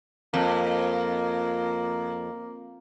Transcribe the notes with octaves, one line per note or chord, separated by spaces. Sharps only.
F2 A#3